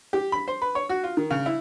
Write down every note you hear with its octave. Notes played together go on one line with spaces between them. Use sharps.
G4
B5
C5
B4
C#5
F#4
F4
D#3
C#3
E4